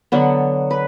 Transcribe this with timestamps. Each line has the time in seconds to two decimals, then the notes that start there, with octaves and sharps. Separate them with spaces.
0.12 D3 F#3 B3
0.71 B4